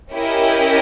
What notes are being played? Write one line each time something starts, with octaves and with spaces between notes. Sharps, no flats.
C#4 E4 G4 A#4 D#5